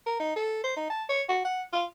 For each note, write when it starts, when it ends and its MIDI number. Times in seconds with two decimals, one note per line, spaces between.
0.07 0.15 70
0.20 0.34 63
0.36 0.62 69
0.64 0.74 72
0.76 0.87 63
0.90 1.04 81
1.10 1.23 73
1.29 1.42 66
1.45 1.63 78
1.73 1.85 65